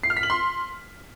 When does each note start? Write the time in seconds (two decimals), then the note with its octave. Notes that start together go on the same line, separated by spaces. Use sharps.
0.03 C7
0.10 F6
0.17 B6
0.23 F#7
0.30 C6